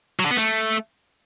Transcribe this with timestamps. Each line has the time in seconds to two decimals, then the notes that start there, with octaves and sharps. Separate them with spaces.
0.20 F#3
0.25 D3
0.31 B3
0.37 A3